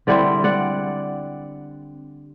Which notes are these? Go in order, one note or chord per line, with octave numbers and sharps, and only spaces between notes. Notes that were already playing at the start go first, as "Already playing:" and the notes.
D3 G3 C4 E4 D5 F#5
D5 F#5